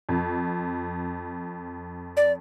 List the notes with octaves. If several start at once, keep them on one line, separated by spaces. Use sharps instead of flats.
F2
D5